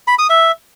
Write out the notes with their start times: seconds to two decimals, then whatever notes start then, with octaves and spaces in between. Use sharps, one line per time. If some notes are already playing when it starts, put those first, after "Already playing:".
0.08 B5
0.19 D#6
0.30 E5